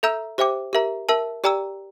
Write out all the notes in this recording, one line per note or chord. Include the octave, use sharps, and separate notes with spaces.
A4 E5 A#5 E6 G6
G4 C5 E5 G5 D6
G4 A#4 E5 A#5
A#4 E5 A5 E6
G4 D5 G5 A#5 E6